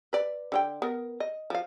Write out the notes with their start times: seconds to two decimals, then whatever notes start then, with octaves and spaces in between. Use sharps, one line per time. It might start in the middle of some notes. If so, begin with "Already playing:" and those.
0.13 B4 D5
0.52 D3 C#4 G5
0.82 B3 A#4
1.20 D#5
1.50 F3 F5